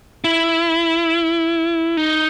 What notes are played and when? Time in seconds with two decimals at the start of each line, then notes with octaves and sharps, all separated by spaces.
0.24 E4
1.97 D#4